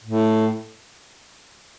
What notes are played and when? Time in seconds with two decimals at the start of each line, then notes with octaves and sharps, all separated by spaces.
0.04 A2